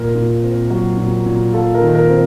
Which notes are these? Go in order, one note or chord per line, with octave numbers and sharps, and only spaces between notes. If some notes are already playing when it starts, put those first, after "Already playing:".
Already playing: A#2 A#4
A#2
C4
F#3
A#2
A#2
F4 A4
A#4
D#3
A#4
C4